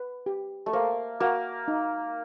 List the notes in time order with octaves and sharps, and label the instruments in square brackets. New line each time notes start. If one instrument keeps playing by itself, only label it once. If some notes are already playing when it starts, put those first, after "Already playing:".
Already playing: [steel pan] B4
G4
[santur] A3
[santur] A#3 [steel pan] C5
[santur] A#3 [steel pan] F#4
[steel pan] D#4